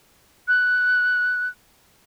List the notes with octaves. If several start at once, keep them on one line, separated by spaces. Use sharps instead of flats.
F#6